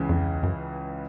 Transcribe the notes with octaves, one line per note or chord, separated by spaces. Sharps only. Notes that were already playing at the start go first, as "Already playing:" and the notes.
Already playing: C#2 C#3 E3
F2
E2
F#2